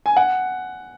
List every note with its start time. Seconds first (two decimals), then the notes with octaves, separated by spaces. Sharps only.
0.06 G#5
0.16 F#5